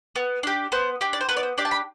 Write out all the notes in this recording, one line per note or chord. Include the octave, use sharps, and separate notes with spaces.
B3
D4 G4
B3 C5
D4 G4
D5
C5
B3 B4
D5
C5
D4 G4 D5
A5
B5